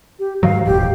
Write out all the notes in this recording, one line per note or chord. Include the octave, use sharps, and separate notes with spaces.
G4
G#2 D#3 F#3 F5
D#1 A1 G4